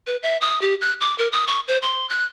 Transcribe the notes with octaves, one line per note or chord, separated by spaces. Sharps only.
B4
E5
D#6
G4
F#6
D6
A#4
D#6
C#6
C5
C6
F#6